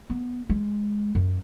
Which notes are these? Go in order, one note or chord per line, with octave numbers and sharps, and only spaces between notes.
B3
G#3
F#2